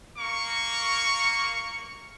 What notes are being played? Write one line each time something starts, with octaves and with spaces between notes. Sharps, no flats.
A#3 C#6